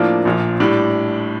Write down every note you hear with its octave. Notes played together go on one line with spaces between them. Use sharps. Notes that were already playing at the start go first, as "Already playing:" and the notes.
Already playing: A2 F3 A#3 D4
A#1 A#2 F3
A2 G3 D4